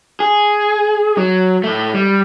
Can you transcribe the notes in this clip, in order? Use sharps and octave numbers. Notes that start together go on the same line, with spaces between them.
G#4
F#3
A2 A3
G3